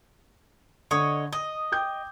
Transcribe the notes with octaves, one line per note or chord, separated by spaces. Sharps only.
D3 C#5 D#5
D#5 D#6
G5 D6 G6